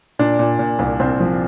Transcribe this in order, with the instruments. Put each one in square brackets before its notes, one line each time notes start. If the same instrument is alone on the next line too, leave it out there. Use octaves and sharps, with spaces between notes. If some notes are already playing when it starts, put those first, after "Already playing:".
[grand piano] A#2 D4
A#2
A#2
C2
C2 C4
F3